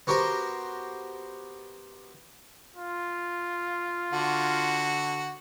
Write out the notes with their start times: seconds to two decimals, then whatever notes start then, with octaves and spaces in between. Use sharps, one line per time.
0.07 B3 F#4 G4 A#4 C5
2.77 F4
4.13 D3 F#4